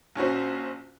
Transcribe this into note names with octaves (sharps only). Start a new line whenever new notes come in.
A#1 C#4 F#4 C5